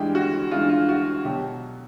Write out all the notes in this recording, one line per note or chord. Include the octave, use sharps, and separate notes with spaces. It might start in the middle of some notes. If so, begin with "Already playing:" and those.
Already playing: G2 E3 G#3 G4
F#4
G2 E3 G#3 F4
F4
F#4
B2 F#3 G4